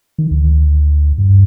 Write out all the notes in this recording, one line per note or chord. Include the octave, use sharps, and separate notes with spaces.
D#3
D2
G2